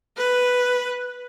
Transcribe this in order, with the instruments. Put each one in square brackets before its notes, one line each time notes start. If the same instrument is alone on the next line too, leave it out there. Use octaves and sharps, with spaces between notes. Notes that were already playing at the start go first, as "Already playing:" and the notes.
[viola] B4